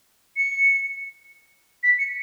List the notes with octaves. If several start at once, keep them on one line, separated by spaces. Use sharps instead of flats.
C#7
B6
C#7